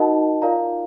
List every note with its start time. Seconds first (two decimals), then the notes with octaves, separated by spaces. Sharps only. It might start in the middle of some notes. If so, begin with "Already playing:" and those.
Already playing: D#4 F#4 A#4 D#5 F#5 A5
0.42 F4 A#4 D5 F5 A#5